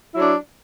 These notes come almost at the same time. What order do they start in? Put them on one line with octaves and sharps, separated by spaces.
E4 F#3 D4